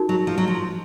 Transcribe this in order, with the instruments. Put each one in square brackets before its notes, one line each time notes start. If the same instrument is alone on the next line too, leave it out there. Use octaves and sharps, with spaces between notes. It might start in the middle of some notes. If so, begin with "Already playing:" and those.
Already playing: [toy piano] D#4 F#4 A#4
[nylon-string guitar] F#3
F3
F#3
F3